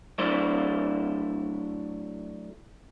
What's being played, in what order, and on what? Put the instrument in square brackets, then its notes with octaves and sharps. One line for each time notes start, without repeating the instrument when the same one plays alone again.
[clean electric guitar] F#3 A3 D4 E4 C5